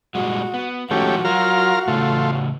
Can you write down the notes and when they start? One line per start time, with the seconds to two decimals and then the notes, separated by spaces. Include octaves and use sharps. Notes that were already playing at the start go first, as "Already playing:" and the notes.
0.15 A#2 G3 G#3 F#4
0.54 B3
0.91 D#3 F3 G#3 A3 C#4 F#4 G4
1.25 F#3 F4 A#4 F6
1.88 A2 C#3 E3 A3 F4